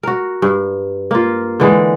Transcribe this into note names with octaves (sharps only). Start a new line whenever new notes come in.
F#4 A#4
G2
A#3 F4
D3 E3 G#3